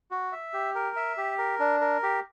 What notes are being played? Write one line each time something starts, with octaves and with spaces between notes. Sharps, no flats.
F#4
E5
G4
A#4
E5
G4
A#4
D4
A#4
G4